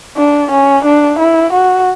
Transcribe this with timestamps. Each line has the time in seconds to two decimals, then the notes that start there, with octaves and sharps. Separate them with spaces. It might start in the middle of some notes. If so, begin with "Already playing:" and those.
0.17 D4
0.51 C#4
0.84 D4
1.19 E4
1.53 F#4